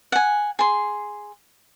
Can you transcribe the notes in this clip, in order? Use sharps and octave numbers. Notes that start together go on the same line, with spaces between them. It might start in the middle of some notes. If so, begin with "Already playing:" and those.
F#5 G#5
G#4 C6